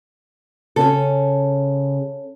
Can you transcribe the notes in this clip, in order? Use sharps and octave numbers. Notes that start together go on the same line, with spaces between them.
C#3 C#4 A4